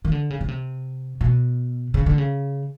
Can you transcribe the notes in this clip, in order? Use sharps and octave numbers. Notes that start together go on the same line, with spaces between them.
D#3
D3
C#3
C#3
C3
B2
C#3
D3
C#3